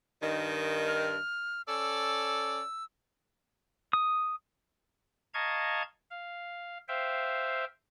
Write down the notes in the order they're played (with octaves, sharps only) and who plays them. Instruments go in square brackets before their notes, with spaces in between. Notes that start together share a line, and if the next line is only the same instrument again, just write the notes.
[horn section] G2 D#3
[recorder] F6
[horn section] C#4 A4 D5 [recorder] E6
[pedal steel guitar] D#6
[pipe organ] D#5 F5 A5 A#5 C#6 G#6
F5
C5 E5 F5 G5